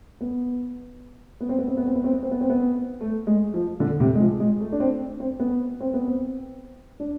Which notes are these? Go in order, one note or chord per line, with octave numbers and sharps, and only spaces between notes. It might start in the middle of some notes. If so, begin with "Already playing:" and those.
B3
B3
C4
B3
C4
B3
C4
B3
C4
B3
C4
B3
C4
B3
A3
G#3
F3
D3
C3
G#3
F3
G#3
A3
D4
C4
C4
B3
C4
B3
C4
D4